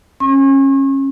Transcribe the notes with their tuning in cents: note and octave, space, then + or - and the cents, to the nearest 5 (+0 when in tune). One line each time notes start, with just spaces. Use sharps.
C#4 -25 C#6 -40